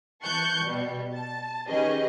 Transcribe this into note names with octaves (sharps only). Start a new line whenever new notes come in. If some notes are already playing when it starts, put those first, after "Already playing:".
E3 A5 C#6 F#6 G6 C#7
B2 G3
A5
D#3 C#4 G4 G#4 B4 D#5